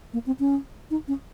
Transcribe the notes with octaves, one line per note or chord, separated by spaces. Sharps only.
A#3
C4
C#4
D#4
C#4